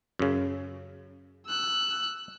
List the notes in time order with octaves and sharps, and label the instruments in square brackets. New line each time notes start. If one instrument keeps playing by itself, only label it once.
[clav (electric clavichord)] F#2 C#3
[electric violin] E6 F#6